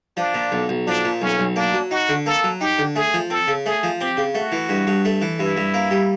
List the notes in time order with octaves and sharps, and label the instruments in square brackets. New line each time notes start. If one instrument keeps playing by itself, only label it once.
[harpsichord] F3 [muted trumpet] D4
[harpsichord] A#2
B1
B1
[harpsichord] F3 [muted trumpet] D4
[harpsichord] A#2
[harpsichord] B1 [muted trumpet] C#4
[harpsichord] B1
[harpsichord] A#3 [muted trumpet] D4
[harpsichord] F#3
[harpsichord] D#4 [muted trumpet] F#4
[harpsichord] D3
[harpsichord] A#3 [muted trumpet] A4
[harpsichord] F#3
[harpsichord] D#4 [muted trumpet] G4
[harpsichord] D3
[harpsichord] A3 [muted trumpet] G#4
[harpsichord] F3
[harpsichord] C4 [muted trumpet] A4
[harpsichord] C#3
[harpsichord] A3 [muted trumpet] G#4
[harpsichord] F3
[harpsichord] C4 [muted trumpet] G4
[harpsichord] C#3
[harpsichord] A3 [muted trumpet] F#4
[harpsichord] E3
G2
G2
A3
E3
[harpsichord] G2 [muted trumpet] E4
[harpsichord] G2
A#3
G3